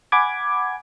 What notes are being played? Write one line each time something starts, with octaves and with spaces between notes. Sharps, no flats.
F#5 G#5 B5 D6 G#6